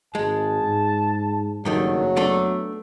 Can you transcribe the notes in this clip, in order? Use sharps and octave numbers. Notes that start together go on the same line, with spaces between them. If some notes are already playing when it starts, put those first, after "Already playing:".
G#1 G#3 A5
G#2
F#1 G2 D#3 F#3 A3
A3 B3 D4